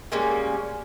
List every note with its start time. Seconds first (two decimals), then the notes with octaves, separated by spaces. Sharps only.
0.12 G3 G#3 A#3 C#4